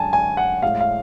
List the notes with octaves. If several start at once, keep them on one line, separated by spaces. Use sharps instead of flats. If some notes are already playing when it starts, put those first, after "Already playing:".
Already playing: F#2 D3 G#3 G#5 A5
G#5
F#5
A2 G#3 F5
F5